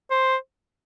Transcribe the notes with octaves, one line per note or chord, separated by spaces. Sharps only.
C5